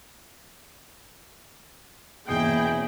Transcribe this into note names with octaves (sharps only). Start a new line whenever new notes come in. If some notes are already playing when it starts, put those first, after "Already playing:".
E2 B2 A#3 C#4 E4 G#4 G5 C7